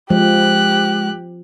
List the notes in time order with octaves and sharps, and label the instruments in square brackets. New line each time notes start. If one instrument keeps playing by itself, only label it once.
[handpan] F3 [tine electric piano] G#3 [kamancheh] G4 F#6